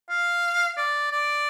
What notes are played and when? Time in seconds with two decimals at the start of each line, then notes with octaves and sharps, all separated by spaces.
0.10 F5
0.77 D5
1.11 D5